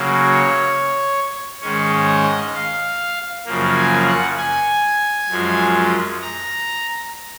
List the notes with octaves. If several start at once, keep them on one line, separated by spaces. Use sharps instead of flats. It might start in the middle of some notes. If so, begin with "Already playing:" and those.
Already playing: C#3 F#3 A#3
C#5
G#2 D#3 G#3 C#4 C#5
D#5
F5
F#2 C#3 F3 A#3
G#5
F#5
G#5
F#2 F3 G#3
A#5